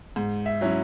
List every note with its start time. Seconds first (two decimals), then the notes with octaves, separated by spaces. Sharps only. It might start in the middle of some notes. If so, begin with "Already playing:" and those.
0.16 G#2
0.46 E5
0.61 F#3 C#4 E4